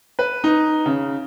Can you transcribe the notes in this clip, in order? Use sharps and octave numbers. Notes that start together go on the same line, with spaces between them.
B4
D#4
C#3